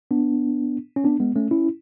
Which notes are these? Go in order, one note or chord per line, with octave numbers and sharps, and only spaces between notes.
B3 D4
C#4
B3 D4
G#3 B3
A3 C#4
C#4 E4